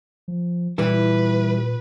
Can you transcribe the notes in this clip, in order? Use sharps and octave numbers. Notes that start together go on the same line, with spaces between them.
F3
A#2 E3 G3 E4 B4